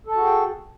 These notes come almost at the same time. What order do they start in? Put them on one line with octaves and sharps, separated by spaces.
A4 A5 F#4 G#4 G5